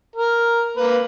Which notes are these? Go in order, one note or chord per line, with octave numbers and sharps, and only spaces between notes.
A#4
A#3 B4